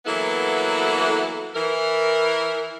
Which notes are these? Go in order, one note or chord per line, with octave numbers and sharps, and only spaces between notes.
E3 F#3 A#3 B3 E4 A4
E3 A#4